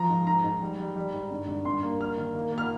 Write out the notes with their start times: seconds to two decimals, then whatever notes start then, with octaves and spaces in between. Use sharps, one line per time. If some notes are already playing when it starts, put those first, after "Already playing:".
Already playing: F3 A#5
0.09 G#2
0.26 G#2 A#5
0.44 G#2
0.62 G3
0.79 G3
0.96 G3
1.13 G#2
1.31 G2
1.47 G2
1.65 G2 C6
1.82 A#3
2.00 A#3 F6
2.17 D#3
2.35 A#3
2.52 A#3
2.58 F6